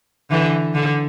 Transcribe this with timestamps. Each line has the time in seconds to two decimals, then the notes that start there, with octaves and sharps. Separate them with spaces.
0.30 D3 E3
0.74 D3